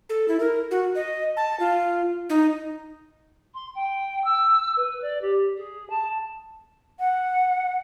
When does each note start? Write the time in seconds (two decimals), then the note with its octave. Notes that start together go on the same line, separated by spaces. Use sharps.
0.09 A4
0.28 E4
0.40 A#4
0.71 F#4
0.95 D#5
1.37 A5
1.60 F4
2.30 D#4
3.54 C6
3.75 G5
4.24 E6
4.77 B4
5.02 D5
5.21 G4
5.57 G#4
5.90 A5
7.00 F#5